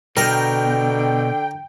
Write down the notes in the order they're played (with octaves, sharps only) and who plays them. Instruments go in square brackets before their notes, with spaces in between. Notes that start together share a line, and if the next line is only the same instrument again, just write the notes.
[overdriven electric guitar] B2 [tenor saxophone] D3 [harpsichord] A#4 [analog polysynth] G5